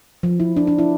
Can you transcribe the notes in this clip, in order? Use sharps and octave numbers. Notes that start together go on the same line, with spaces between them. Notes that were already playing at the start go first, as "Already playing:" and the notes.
F3
E4
D4
D4
E4